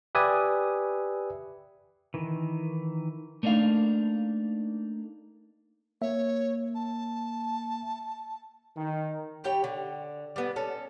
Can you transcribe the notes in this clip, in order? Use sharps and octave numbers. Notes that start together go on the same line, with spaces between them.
G4 B4 D5 E5 G#5 D#6
D#3 E3
A3 A#3 D4 D#4 F5
A#3 C#5 E5
A5
D#3
G3 G4 C#5 G5
D3
G3 B3
C#4 A4